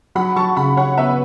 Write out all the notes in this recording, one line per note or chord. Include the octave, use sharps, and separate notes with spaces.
F#3 F#5 B5
F#3 A5 C#6
C#3 F#5 B5
C#3 C#5 F#5
B3 B4 E5